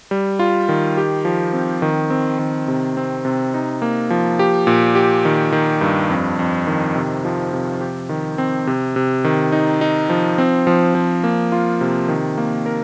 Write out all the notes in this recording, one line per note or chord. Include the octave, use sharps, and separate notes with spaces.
G3
F4
D#3
G4
F3
C4
D#3
C4
D#3
C3
C4
C3
D#4
A#3
F3
G4
A#2
G4
D#3
D#3
G2
F2
F2
D#3
C3
F3
C3
G4
D#3
C4
C3
C3
D#3
D#4
D#4
F3
C4
F3
F3
A#3
F4
C3
D#3
A#3
A#4